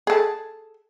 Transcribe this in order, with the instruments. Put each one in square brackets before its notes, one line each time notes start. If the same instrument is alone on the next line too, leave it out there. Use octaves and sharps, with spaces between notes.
[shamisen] G#4 A4